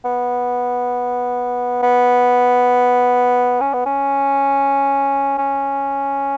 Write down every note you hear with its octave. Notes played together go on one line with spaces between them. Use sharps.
B3
B3
C#4
B3
C#4
C#4